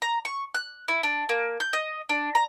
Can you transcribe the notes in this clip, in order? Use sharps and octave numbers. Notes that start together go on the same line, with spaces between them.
A#5
C#6
F#6
E4
D4
A#3
G6
D#5
D4
A#5